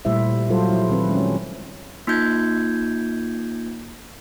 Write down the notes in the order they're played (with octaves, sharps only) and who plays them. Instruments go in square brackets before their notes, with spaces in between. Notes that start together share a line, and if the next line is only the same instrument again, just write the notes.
[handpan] A#2 G3 A3 E4 C5 E5
F#3 G3 F4 A4 C5
F3 E4
D#3 C4 B4
G#3 C#4
[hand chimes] A#3 D#4 F4 G6 G#6